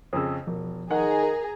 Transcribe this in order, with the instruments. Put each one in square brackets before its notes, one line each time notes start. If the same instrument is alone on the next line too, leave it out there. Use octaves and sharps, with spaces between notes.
[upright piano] F2 C#3 [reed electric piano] D#6 E6
[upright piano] E1 [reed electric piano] F3
[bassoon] D#3 [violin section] G#4 A#5 [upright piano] F#5
[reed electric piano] A#4